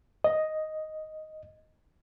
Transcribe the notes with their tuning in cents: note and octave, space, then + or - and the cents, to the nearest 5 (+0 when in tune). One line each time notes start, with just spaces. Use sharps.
D#5 +5